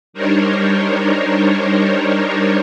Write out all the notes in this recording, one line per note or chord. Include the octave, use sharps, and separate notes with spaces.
G3 D4 D#4 A#4 C5 C#5